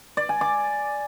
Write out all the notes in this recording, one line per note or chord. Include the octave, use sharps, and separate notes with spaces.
D5
G#5
D6